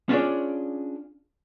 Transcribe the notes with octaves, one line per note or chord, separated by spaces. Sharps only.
C#4 D4 F4 G#4 C#5 D5